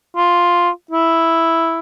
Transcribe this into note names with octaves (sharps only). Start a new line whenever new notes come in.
F4
E4